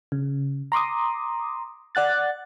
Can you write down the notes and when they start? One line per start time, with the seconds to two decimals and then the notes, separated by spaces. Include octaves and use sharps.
0.12 C#3
0.72 A#5 C6 D6 D#6
1.95 D5 F#5 F#6 A6